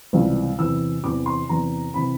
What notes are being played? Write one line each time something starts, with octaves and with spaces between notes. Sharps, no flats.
C#2 C3 E3 G3
E2 C3 E3 E6
E2 C3 E3 D6
C6
E2 C3 E3 A#5
C3 E3 B5